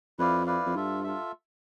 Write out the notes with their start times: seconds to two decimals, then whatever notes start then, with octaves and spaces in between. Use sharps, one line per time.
0.19 F2 E4 B4 D5 F5
0.47 E4 B4 D5 F5
0.66 F2
0.75 G2 F4 A4 E5
1.04 F4 A4 E5